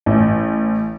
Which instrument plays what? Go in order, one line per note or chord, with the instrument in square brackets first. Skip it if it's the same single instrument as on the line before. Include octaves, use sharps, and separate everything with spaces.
[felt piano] A1